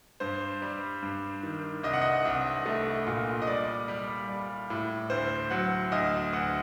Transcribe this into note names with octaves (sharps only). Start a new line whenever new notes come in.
G2 C5
G3
G2
D#3
C2 D#5
F#5
D#5
C2
A3
A#2
D#5
G3 D5
G3
G3
A2
D2 C5
F#3 F#5
D2 D#5
D2 F#5